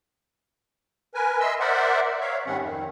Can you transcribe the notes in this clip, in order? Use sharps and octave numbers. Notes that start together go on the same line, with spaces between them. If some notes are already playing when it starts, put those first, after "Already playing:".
A#4 B4 G#5
D#5 E5 C6 E6
A#4 C5 D5 E5 F#5
C#5 E5 F5
G#2 D#3 G3 C4 C#4 F#5
F2 D#3